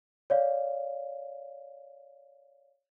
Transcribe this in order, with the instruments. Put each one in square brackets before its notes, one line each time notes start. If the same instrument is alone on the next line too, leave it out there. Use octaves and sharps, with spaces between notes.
[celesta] C#5 D5 F5